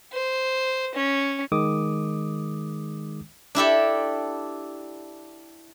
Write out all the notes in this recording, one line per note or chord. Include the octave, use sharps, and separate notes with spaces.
C5
C#4
D#3 G#3 D6 D#6
D4 E4 G4 A4